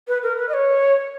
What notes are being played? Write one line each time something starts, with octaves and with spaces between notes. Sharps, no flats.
B4
A#4
B4
D#5
C#5